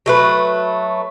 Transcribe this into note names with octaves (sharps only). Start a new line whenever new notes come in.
F#3 A3 B4